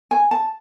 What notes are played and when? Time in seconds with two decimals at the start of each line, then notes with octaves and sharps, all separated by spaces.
0.11 G#5
0.31 A5